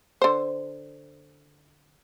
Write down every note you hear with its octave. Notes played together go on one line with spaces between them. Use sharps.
D3 C5